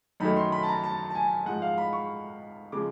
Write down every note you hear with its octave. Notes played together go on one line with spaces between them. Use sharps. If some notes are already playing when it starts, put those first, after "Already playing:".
F#2 D#3 F#3 A3 B5
C6
B5
A5
A#5
A5
A5
G#5
G#2 F3 G#3 F#5
F5
B5
C#6
C#3 F3 G#3 D6